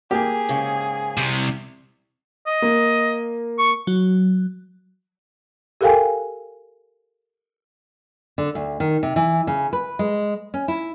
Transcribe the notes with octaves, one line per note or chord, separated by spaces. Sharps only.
A#3 G4 G#4
G#2 C#3
C2 C3
D#5
A#3
C#6
F#3
G4 A4 A#4 F5 G5 G#5
D3
D2
D#3
C3
E3
C#3
B4
G#3
C#4
E4